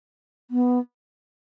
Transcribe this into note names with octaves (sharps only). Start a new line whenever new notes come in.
B3